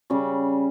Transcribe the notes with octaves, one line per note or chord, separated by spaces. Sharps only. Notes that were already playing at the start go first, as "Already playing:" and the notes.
C#3 G3 C#4